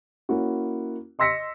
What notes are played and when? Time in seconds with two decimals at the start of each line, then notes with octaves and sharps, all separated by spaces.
0.29 A#3 C#4 E4 F#4
1.19 D#5 C6 E6 A#6 B6 C#7